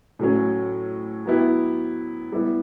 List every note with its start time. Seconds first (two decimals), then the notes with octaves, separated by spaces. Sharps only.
0.19 A2 F#3 C#4
1.26 F#3 B3 E4 G4
2.32 G3 B3 E4